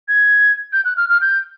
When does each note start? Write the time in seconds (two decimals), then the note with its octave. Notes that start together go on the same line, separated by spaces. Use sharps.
0.08 G#6
0.73 G6
0.85 F#6
0.97 F6
1.09 F6
1.21 G6